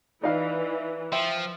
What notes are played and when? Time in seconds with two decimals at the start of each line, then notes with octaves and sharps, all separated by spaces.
0.23 E3 D#4 D5 F5
1.12 F3 E5 G5 E7